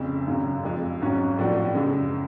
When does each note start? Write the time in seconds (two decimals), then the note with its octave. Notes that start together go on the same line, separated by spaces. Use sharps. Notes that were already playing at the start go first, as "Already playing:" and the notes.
Already playing: F1 F2 C#3
0.27 G#1 F#2 C#3 F#3
0.63 F2 F3 G#3
1.01 G#1 G#2 F#3 C#4 F#4
1.38 A2 F3 B3 D4 F#4
1.75 F#2 C#3 G#3